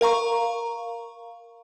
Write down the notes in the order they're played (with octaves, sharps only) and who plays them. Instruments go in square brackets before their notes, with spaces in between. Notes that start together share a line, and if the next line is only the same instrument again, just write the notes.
[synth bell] A#4 F5 A#5 C#6